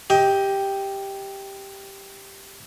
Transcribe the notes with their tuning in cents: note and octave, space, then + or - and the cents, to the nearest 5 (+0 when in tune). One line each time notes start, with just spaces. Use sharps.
G4 +0 D#5 +25